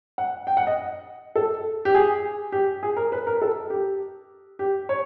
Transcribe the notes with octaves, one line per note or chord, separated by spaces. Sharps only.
F#5
G5
F#5
D#5
A4
G4
G#4
G4
G#4
A#4
B4
A#4
A4
G4
G4
C#5